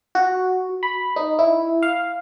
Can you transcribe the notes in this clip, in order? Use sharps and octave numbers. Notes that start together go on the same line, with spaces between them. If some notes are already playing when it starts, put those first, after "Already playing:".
F#4
B5
D#4
E4
F5